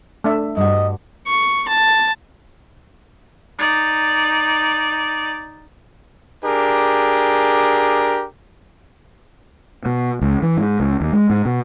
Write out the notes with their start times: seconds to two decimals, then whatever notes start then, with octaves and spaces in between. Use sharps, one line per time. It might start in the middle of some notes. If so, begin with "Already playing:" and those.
0.24 A3 D4 E5
0.57 G2 F#4 D#5
1.27 C#6
1.68 A5
3.58 D#4 D5
6.44 D4 G4 G#4 A#4
9.86 B2
10.21 C#2
10.42 E3
10.57 G#2
10.80 C#2
11.01 D#2
11.13 G#3
11.30 G#2
11.45 B2